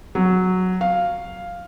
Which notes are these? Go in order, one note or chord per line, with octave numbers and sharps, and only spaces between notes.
F#3
F5